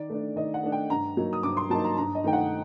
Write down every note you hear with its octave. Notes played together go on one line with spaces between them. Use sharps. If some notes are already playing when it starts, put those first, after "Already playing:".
Already playing: D#3 D5
A3 D4
D#3 D#5
F#5
A3 D4
G5
G2 A#5
F#3 A#3 D#4
D#6
G2 D6
C6
F#3 A#3 D#4 A5
A#5
G2 A#5
D#5
D#3 A3 D#4 G5
F#5